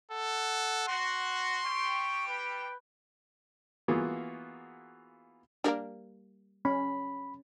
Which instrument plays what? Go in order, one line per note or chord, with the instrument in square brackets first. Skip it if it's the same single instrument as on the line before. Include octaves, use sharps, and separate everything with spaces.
[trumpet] A4 [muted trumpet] F#5
[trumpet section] F#4 [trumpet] C6
[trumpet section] G3 G4 G5 [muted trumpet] C#6
[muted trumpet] B4
[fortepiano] E3 A#3 B3 F4 F#4 G#4
[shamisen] G3 A3 A#3 [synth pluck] D4 A#4
[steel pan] C#4 [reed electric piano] B5